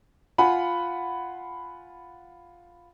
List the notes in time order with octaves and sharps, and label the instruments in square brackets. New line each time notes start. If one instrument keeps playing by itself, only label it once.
[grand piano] F4 F#5 G#5 B5